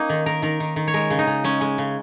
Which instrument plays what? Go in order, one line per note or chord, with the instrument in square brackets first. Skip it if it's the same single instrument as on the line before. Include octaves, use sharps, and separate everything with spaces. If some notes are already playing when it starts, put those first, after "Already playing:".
Already playing: [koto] A#3 C#4 D#4
D#3
D#3 A#4
D#3 A#4
D#3
D#3
C#5
G#3 A#4
C#3
D#4
C#3
G#3 C#4
G#3
C#3